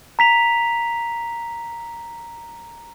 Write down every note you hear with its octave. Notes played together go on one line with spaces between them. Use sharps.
A#5 B6 F7